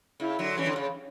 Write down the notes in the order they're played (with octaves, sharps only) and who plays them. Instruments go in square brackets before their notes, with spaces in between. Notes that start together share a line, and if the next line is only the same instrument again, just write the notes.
[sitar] C#3 [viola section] E4
[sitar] D3 F#3
[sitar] E3 G3 [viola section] C#4
[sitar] D3
C#3